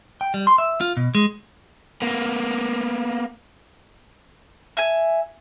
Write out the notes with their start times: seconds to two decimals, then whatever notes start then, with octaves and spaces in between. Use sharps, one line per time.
0.21 G5
0.34 G3
0.47 C6
0.58 E5
0.81 F4
0.97 B2
1.15 G#3
2.02 A#3 B3
4.77 E5 G#5